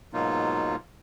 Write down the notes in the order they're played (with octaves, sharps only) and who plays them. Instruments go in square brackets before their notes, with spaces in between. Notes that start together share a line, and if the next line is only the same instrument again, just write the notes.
[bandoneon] G#2 B2 F#3 A#3 D#4 F4